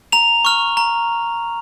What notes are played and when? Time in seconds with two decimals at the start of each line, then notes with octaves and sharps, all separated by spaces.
0.12 A#5 F7
0.45 C#6 F6
0.77 A#5